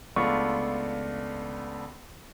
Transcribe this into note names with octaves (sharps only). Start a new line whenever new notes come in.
C#2 A3 B3 D4 F4 C#6